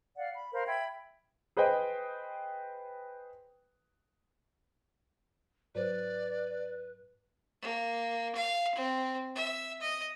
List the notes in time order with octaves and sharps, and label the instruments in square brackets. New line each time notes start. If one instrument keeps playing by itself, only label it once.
[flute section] D5 F5 F#5
B5
A#4 C5 F5 B5
E5 G5 B5 G#6
[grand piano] G#4 B4 C5 D#5 G5
[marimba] G#2 F#3 C5 [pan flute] B4 [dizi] D5
[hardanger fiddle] A#3
F5
C4
E5
D#5